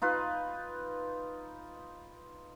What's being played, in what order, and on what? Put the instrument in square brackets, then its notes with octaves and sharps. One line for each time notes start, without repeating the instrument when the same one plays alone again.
[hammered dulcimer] D#4 F4 B4